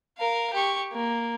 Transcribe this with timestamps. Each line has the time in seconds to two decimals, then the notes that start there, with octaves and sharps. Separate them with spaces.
0.18 A#4 F5
0.53 G4 C#6
0.92 A#3